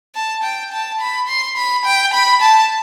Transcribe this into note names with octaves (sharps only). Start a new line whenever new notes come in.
A5
G5
A5
B5
C6
B5
G5
B5
A5